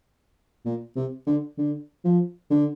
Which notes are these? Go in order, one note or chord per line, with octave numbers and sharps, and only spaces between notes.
A#2
C3
D3
D3
F3
D3